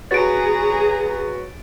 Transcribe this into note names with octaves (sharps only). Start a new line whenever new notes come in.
F#4 G#4 B4 C#5 A#5 A6 D7